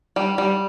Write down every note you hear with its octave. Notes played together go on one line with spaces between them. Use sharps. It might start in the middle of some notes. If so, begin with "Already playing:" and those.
G3
G3